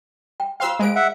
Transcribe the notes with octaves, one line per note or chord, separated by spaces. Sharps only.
G5
F4 C5 F5 G5 C6 E6
G#3 A#4 C5 F5 D7
E5 F#5